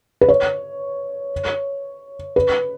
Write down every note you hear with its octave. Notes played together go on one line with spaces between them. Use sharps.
B4
C#5
B4